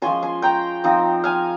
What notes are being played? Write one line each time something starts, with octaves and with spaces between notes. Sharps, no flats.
F3 G#3 C#4 F4 G#5 C6
G#5 C6
G5 A#5
F3 C4 D#4
F5 G#5